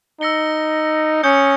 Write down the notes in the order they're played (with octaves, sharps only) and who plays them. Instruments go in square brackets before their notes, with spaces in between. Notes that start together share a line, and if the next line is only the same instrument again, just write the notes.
[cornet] D#4 [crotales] E6 A#6 C#7 G7
[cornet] C#4 [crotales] D#6 G6 C#7 G7